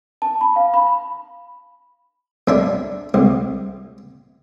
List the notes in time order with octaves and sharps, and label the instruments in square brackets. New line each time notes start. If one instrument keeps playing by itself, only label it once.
[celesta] A5
B5
F5
B5
[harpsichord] B1 D4 E5
C2